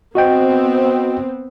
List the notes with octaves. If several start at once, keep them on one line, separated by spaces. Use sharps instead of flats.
B3 C4 F#4 D#5 G5